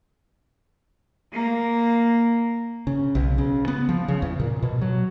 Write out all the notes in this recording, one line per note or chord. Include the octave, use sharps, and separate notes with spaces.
A#3
C#3
B1
C#3
B3
F3
C#3
E2
A#2
B2
F#3